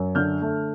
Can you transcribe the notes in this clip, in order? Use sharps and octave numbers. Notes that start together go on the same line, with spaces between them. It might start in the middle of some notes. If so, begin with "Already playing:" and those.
Already playing: F#2
D3 F6 G6
A3